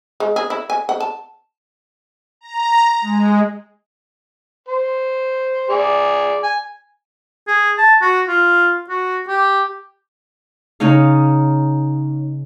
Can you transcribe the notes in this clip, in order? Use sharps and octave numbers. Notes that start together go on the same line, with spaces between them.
G#3
G#4
E4
G#5
F#5
A5
A#5
G#3
C5
G#4 D5
G#5
G#4
A5
F#4
F4
F#4
G4
C#3 D#4 C#5 F5